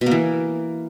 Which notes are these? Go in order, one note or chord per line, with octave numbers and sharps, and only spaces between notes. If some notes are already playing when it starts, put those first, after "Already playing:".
B2
A#3
E3